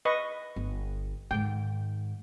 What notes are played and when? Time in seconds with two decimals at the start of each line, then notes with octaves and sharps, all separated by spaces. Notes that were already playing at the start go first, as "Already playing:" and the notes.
0.05 B4 D#5 C#6
0.56 G1
1.31 G#2 D#3 G5